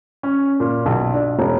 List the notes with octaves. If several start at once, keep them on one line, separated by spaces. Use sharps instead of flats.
C#4
A#2
B1
D4
E1